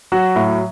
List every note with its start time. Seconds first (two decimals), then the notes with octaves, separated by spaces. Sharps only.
0.12 F#3 F#4
0.36 A2